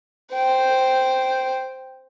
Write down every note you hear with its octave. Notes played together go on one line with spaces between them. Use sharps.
C5 G5